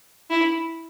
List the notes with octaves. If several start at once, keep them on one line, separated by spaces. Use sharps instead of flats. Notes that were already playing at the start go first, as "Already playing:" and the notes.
E4